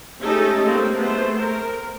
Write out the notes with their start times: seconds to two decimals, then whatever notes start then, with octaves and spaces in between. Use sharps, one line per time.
0.23 G#3 A3 C#4 D#4 G4 A4
0.67 A3 A#3 C4
0.97 A3 B3 G#4 C5
1.38 A#4